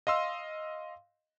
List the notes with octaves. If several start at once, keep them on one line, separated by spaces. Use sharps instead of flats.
D#5 F5 C6 E6